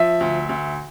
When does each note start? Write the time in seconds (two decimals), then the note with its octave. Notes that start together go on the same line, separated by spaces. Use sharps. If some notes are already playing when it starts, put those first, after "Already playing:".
Already playing: F3 E5
0.21 D2
0.49 D2